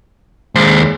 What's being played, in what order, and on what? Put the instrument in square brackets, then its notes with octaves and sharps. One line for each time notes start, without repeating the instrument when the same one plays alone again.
[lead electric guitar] D#2 C5 [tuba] G#3